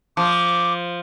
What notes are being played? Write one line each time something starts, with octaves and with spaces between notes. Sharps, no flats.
F3 D6